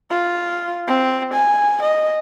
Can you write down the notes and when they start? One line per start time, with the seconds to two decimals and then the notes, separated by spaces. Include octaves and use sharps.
0.11 F4
0.87 C4
1.34 G#5
1.83 D#5